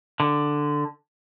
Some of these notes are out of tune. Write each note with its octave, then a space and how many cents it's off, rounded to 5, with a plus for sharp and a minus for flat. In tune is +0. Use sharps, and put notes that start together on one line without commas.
D3 +5